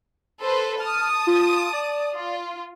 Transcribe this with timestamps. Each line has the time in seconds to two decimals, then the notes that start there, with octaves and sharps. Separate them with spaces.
0.42 A4 B4 C5
0.80 A5 D#6 F6
1.27 F4
1.73 D5
2.15 F4